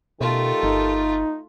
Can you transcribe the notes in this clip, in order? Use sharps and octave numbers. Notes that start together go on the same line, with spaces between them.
B2 D#3 A3 F4 G4 A4
G1 D#4